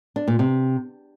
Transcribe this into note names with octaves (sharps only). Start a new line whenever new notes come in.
D4
A#2
C3